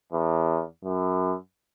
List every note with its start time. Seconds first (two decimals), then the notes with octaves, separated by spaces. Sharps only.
0.13 E2
0.85 F#2